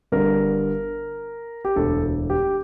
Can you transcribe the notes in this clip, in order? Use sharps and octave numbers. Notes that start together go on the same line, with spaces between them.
G1 G2 D3 A#4
G4
E1 D2 D3 A4
G4